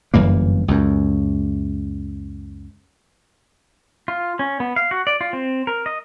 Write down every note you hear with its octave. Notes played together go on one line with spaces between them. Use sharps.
G1 F#2 E3 A#3
C#2 F#2
F4
C#4
B3
F5
F#4
D5
F4
C4
A#4
D#5